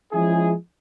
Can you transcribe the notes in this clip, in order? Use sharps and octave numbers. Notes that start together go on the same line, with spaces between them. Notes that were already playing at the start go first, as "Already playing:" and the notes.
F3 G#3 C#4 E4 G#4